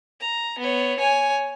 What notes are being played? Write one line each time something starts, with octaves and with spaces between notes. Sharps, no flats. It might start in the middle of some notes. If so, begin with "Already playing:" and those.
A#5
B3 C#5
C#5 G#5